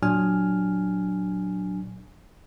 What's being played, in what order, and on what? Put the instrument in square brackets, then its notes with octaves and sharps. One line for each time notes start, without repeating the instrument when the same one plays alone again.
[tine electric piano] A#2 F#3 D4 G#5 F6